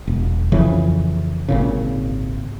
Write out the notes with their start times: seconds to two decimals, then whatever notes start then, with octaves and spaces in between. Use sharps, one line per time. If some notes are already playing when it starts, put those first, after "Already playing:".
0.07 E1
0.52 F2 C#3 E3
1.49 G#1 A#2 C#3